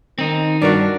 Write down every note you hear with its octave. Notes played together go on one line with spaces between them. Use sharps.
D#3 C4 D#4
G2 D4 F#4 A#4 D5